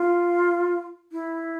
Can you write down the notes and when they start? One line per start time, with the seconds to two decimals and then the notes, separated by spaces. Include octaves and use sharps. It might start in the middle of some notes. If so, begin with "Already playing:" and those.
Already playing: F4
1.12 E4